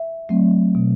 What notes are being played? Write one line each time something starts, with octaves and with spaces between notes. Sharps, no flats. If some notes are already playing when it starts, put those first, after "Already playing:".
Already playing: E5
F#3 A3 C4
B2